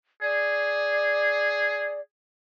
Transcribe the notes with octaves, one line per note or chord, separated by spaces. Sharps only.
G#4 D5